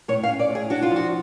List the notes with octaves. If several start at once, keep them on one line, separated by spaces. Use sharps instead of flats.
A2 C#5
F5
C#4
D5
A2
G#4
D4 F#4
F4
F3
F#4